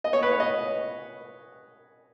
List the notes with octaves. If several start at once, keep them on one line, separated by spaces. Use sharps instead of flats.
D#5
C#5
B4
C#5
D#5